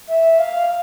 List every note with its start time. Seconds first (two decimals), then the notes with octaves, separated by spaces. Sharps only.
0.09 E5
0.39 F5